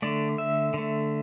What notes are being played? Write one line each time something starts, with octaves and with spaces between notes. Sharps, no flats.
D3 A3 D5
E5
D3 A3